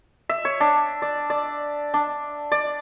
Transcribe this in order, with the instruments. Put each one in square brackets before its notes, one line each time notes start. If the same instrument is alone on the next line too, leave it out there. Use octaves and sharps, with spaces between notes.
[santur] E5
C#5
D4
D5
D5
D4
D5